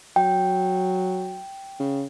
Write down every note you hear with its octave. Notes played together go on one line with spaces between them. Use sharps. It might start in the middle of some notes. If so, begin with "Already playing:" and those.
F#3 G5
C#3